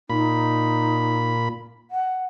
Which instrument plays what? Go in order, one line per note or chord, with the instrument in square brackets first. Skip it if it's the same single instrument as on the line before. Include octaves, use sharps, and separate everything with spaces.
[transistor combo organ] A#2 B5 [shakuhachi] D#4
[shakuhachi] F#5